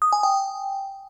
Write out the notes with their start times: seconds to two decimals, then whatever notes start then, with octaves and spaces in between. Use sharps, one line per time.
0.02 D#6
0.13 G#5
0.23 G5